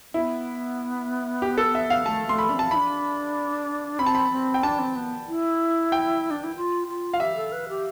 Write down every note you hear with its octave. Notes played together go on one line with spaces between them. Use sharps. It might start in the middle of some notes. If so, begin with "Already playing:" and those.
B3 E4
G4
A4
E5
F5
A3 A5
A3 B3 C6
B5
D4
C4
A5
D4 E4 B5
C4 B5
A5
B5
C4
G5
D4 A5
C4
B3
E4
G5
D4
E4
F4
F4
F5
G4 E5
A4
B4
G4